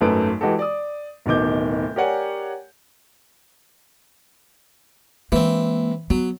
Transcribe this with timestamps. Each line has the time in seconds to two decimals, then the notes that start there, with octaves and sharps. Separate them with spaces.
0.01 G#1 F#2 A3 B4 D7
0.41 E3 G#3 F#4 G4 A4
0.59 D5 D#6
1.26 D1 B2 D#3 D6 G6
1.96 G4 A#4 C#5 D5 F#5 G#5
5.32 E3 G#3 A#3 C4
6.10 F#3 B3